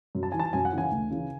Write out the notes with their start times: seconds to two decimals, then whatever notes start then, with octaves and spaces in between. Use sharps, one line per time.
0.15 F#2
0.23 A5
0.32 E3 G#5
0.39 A5
0.53 F#2 G#5
0.65 F#5
0.73 C#3 E3 G#5
0.91 D2
1.11 C#3 E3